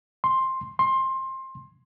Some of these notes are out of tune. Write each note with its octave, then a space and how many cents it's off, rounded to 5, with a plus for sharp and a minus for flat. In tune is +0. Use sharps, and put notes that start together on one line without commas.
C6 +10
C6 +20